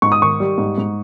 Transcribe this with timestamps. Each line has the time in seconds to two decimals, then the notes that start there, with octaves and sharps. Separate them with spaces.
0.02 G#2 C#6
0.12 D#6
0.21 D#3 C#6
0.40 G3
0.58 G#2
0.78 G#2